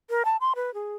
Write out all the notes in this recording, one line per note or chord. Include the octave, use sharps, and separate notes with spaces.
A#4
A5
C6
B4
G#4